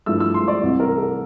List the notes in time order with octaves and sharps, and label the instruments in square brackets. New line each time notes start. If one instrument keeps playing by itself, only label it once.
[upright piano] G2 F3 A3 E4 E6
E6
C6
D5
C2 C3 E3
A#4
A4